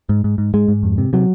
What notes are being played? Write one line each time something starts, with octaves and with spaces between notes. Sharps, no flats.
G#2
G#2
G#2
G#2 G#3
G#2
F2
C3
C3 F#3